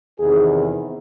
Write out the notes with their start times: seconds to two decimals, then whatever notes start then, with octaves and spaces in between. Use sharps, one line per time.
0.19 E2 C3 D#3 G#4